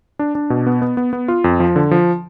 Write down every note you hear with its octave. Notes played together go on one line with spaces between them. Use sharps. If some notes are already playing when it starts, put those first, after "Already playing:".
D4
D4
B2
B3
B3
B3
B3
F4
F2
F3
D3
F3